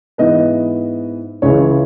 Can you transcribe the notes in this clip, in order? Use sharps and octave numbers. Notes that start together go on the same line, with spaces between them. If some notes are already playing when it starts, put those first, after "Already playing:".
G#2 E3 B3 B4 D#5
C#2 C#3 E3 C#5